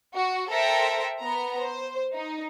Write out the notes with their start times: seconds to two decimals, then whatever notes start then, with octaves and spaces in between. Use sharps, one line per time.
0.13 F#4
0.49 A4 A#4 C5 E5 G5 A#6
1.20 B3 A#5
1.61 C5
2.13 D#4